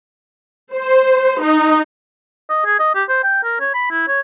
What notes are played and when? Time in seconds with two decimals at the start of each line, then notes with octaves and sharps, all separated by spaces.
0.75 C5
1.41 D#4
2.50 D#5
2.66 G#4
2.80 D#5
2.95 G4
3.09 C5
3.23 G5
3.44 A#4
3.60 C#5
3.74 B5
3.90 E4
4.08 C#5